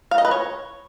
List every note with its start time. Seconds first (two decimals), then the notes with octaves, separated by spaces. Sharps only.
0.11 F5
0.18 D#5
0.25 B4
0.31 C#5